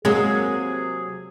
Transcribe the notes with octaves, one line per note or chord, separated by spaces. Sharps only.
C3 F#3 G#3 A#3 G#4